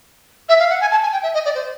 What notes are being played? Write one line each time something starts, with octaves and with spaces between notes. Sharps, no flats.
E5
F5
F#5
G#5
A5
G#5
G5
E5
D#5
D5
C5